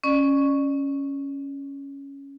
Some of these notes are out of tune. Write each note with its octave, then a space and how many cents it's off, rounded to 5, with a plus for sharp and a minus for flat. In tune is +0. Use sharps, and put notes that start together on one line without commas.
C#4 +0 D5 +35